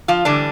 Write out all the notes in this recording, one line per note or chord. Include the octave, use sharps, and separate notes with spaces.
F3 F4
A2 D3 E3 G3 D4